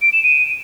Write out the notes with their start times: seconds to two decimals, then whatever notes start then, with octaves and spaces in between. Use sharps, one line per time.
0.02 D7
0.13 E7
0.23 D#7